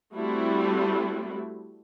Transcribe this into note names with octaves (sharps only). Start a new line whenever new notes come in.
G3 A3 C4 E4 F#4